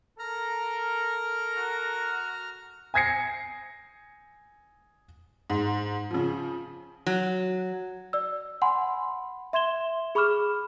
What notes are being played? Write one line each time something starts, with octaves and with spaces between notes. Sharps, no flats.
A4 A#4 A#5 F6
F#4
G#5 D#6 G#6 A#6 C7 C#7
G#2
C#3 F3
F#3
D5 E6
F#5 G#5 B5 C6
E5 C6 G#6 E7 G7
G#4 B5 C#6 D6 F6 E7